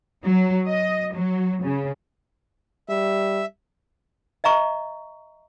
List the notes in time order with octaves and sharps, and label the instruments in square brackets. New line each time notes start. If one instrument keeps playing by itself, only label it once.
[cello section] F#3
D#5
F#3
C#3
[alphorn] G3 [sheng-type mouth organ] E5
[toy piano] D#5 E5 A#5 C#6